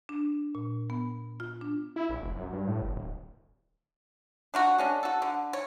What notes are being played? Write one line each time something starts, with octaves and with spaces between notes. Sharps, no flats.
D4
A#2
B3
F4
D4
E4
A#1
F1
F#2
G2
A2
G1
D1
D4 F4 F#4
G#3 C#4 D4
F#4 A4
D3
C#5